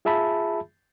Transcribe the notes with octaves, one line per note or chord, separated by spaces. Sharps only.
F4 G#4 E5 A5 B5